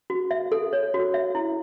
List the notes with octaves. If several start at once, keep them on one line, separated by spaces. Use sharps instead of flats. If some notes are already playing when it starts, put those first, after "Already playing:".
F#4
E5
A4
C#5
F#4
E5
E4